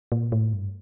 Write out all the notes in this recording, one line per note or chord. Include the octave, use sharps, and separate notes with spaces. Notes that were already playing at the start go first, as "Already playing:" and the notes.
A#2
A2
G2